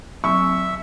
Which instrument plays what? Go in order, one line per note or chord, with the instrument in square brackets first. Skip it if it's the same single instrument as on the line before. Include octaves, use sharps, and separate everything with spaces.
[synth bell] F#3 C4 [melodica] E5 [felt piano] C#6